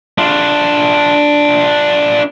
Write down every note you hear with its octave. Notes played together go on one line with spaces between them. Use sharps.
D4 F4